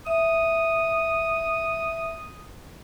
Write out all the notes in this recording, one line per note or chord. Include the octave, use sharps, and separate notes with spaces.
E5 D#6